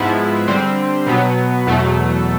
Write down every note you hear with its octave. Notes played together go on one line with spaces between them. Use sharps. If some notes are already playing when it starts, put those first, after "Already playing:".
Already playing: G#2 F3 G#3 B3 E4
D3 G3 C4
B2 F#3 B3
E2 B2 F#3 A3